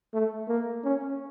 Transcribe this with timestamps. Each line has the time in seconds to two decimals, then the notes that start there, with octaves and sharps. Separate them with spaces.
0.14 A3
0.49 A#3
0.84 C#4